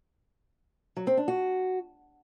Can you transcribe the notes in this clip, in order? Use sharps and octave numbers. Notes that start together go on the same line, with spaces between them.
F#3
C4
D4
F#4